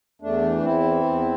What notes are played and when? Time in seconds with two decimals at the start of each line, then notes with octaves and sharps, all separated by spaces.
0.21 E2 A3 D4
0.42 E3
0.62 E2 C4 E4
0.84 E3
1.04 E2